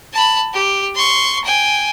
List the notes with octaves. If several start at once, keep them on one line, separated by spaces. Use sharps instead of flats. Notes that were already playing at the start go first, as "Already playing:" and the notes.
A5 B5
G4
C6 C#6
G5 G#5